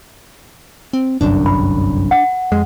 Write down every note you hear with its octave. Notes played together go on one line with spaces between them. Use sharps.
C4
G1 C2 F#2 D4
B5
F#5
F2 G#3